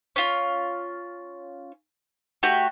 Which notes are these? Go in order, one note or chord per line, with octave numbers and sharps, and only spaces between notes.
C#4 F4
A3 F#4 G4